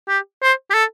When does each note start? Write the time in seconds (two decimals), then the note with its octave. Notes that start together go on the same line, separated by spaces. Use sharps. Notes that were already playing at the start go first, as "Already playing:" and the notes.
0.08 G4
0.42 C5
0.70 G4
0.74 A4